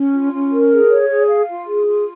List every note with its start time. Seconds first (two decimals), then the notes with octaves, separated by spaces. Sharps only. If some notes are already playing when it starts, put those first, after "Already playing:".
Already playing: C#4
0.12 F4
0.32 C#4
0.50 A#4
0.70 G#4
0.89 C#5
1.09 G#4
1.28 F5
1.47 F4
1.66 G#4
1.86 F4